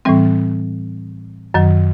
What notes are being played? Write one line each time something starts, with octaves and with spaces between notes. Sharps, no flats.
A2 E3 G3 C4
F#2 D#3 F#3